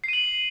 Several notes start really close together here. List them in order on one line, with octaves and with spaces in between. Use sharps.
C7 D#7 F#7